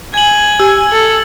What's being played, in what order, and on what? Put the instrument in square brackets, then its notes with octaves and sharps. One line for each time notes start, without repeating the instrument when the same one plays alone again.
[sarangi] G#5 [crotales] G#6 F#7
[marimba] G4 [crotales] E6
[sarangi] A4